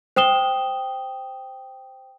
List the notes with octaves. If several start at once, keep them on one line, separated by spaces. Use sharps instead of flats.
C5 G5 D#6 E7 G7